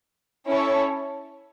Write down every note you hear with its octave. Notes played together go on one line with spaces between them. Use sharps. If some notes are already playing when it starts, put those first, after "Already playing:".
C#4 E4 A4 C#5